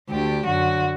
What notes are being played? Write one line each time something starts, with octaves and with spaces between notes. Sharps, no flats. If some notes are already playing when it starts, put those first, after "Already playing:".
D2 D3 G4
F#2 D3 F#4